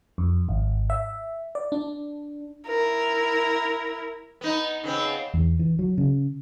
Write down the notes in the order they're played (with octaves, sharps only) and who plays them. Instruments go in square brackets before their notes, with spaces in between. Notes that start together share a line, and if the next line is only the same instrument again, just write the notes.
[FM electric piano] F2
G#1
E5
D5
D4
[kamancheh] E4 A#4
[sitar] B3 D#4
C#3 B3 C4
[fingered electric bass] E2
E3
F#3
C#3